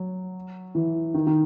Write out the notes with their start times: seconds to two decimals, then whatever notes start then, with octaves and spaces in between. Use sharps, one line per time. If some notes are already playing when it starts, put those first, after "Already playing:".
Already playing: F#3
0.75 E3
1.14 D#3
1.27 D#3